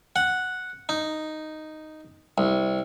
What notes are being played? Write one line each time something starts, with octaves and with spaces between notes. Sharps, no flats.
F#5
D#4
C2